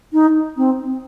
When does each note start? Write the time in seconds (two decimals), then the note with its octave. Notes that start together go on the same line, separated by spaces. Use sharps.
0.13 D#4
0.57 C4